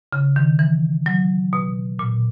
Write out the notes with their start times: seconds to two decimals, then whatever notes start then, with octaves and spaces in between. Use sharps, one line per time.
0.13 C#3
0.36 D#3
0.59 E3
1.06 F#3
1.53 B2
1.99 A#2